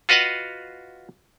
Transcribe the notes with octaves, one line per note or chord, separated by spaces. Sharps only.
F4 F#4 B4 D#5 F5 F#5